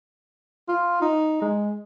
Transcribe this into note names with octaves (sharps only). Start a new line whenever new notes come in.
F4
D#4
G#3